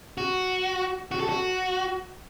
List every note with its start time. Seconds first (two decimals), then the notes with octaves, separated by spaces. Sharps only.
0.18 F#4
1.11 F#4
1.20 A4
1.29 F#4